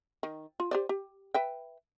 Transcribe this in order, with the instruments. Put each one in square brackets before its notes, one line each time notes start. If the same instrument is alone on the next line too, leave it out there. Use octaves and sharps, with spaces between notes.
[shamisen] D#3
F4
G4 C5 D5
G4
B4 E5 G5